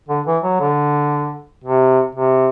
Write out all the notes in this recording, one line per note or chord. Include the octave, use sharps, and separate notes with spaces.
D3
E3
F#3
D3
C3
C3